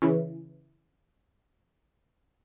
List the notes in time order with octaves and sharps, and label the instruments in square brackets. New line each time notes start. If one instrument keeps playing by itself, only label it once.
[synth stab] C#3 E3